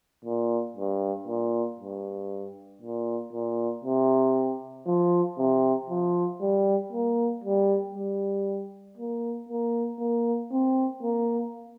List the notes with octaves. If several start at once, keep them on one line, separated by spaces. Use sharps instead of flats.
A#2
G2
A#2
G2
A#2
A#2
C3
F3
C3
F3
G3
A#3
G3
G3
A#3
A#3
A#3
C4
A#3